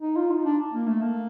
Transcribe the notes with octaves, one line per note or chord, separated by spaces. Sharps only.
D#4
F4
D#4
D4
A#3
A3
A#3